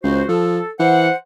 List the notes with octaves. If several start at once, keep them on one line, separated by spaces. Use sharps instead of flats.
C#2 F#4 C5
F3 A4
E3 C5 F#5